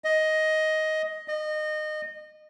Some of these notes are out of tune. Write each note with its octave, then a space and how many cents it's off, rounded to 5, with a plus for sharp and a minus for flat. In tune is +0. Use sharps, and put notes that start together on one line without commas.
D#5 +10
D#5 -25